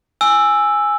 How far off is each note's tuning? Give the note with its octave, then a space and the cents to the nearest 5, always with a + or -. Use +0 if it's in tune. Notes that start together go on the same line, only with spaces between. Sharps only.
G#5 +0 E6 +0